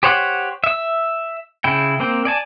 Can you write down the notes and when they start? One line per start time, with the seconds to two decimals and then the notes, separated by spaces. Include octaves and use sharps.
0.03 G4 C5 C#5 F#5
0.64 E5 E6
1.64 C#3 E4 G5
2.00 A#3 C4 G5
2.25 D5 G#5 A5